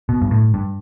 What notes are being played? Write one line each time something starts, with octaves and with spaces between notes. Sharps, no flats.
B2
G2
A2
G2